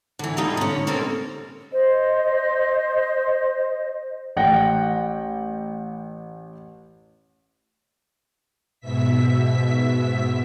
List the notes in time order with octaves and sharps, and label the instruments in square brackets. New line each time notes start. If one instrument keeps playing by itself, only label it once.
[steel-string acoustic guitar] D3 E3
G3 A#3 D#4 F4 G4 A4
D3 C#4
B2 A#3 C4 C#4 A4 A#4
[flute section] C5 D#5
[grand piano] A1 F#5 G5 A#6
[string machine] G#2 B2 E5 B6